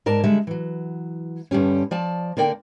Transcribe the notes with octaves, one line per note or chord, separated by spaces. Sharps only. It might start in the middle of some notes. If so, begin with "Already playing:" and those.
G#2 A#4 D5 A5
D3 G3 G#3 E5
E3 F#3
G2 D3 G3 C#4
F3 D5 A5
D3 A#3 A#4 D5 F#5 G5